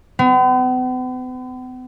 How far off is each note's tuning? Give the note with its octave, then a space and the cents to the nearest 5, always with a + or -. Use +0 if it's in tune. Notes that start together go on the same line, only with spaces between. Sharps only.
B3 +45